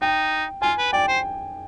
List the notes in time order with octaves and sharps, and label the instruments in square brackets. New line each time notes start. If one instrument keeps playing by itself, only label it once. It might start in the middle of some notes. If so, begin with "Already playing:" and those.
[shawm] D#4 [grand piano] G5
[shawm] F4 [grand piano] G#5
[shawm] B4
[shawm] D5 [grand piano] G5
[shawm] C5